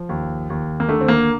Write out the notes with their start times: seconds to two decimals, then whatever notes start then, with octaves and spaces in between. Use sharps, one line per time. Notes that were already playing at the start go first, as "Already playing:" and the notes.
Already playing: F3
0.09 D#2
0.50 D#2
0.80 A#3
0.88 D3 A3
1.01 C4
1.08 A#3